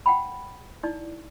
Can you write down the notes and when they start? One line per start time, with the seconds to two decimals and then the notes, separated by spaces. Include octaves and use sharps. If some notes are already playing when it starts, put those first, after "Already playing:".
0.06 F#5 G5 B5
0.83 D#4 E4 D5